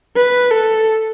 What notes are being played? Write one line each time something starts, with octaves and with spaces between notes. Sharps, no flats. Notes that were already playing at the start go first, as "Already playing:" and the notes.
B4
A4